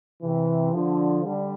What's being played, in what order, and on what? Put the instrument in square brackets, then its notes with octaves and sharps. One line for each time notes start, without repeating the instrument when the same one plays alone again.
[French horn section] C3 [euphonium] E3
[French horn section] D3 [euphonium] F3
[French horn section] D3 [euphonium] G3